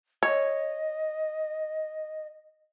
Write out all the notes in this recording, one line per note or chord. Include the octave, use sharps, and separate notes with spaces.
C#5 D#5